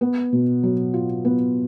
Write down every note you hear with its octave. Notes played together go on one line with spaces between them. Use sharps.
B3
B2
F#3
F4
B3